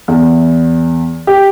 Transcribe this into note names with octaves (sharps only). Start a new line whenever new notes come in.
E2
G4